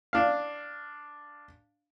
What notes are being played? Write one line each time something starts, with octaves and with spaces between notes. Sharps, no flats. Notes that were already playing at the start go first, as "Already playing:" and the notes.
D4 F5